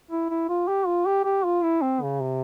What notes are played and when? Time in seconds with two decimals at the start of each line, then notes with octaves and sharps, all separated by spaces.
0.11 E4
0.29 E4
0.49 F4
0.68 G4
0.87 F4
1.06 G4
1.25 G4
1.45 F4
1.63 E4
1.82 C4
2.02 C#3
2.21 C3